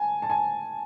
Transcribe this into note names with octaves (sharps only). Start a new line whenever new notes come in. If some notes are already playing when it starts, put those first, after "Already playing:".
Already playing: G#5 A5
A5
G#5